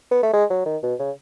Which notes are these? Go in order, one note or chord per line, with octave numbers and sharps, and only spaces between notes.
B3
A3
G#3
F#3
D#3
B2
C#3